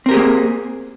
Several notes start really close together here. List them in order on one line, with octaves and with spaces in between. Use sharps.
C4 A#4 G4 G#4 A#3